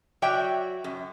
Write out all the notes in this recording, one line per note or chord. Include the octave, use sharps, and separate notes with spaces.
F#3 F#4 D5 E5 G5
F#2